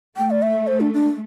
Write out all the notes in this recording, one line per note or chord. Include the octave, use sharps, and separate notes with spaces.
A3 G5
D5
E5
C5
D4
D4